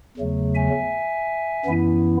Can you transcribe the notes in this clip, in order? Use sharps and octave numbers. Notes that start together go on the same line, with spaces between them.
E2 C#3 F#3 A3
E5 G#5
F#2 E3 B3 E4